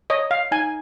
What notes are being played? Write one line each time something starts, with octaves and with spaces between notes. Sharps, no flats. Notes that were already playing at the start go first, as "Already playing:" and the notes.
C#5 D#5
F5
D#4 G#5